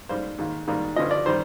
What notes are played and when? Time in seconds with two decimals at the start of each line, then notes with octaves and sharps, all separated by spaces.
0.09 G#2 G3 A#3 C5
0.38 G#2 D#3 A#3
0.68 G#2 D#3 G3 A#3
0.96 G2 D3 F3 D#5
1.11 D5
1.26 D#3 G3 C5